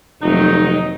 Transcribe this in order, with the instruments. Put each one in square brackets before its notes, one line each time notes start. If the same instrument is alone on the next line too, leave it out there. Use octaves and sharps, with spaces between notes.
[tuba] F1 [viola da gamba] D#3 F#3 A#3 [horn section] D#4